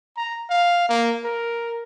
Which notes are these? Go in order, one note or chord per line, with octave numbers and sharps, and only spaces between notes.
A#5
F5
A#3
A#4